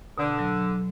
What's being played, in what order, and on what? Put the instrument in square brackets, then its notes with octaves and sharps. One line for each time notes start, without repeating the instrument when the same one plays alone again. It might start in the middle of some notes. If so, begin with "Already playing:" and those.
[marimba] B2 [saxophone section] D3
[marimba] F#3
F#3